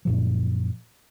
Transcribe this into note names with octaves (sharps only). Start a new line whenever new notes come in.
F#2 A#2 F3